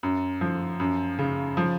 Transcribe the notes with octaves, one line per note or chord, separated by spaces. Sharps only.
F#2
F3
F#2
C#3
F3